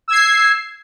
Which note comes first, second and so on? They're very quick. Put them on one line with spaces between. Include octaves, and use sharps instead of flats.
E6 G#6 C7